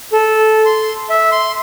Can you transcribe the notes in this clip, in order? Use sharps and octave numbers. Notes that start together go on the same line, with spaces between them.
A4
C6
E5
C6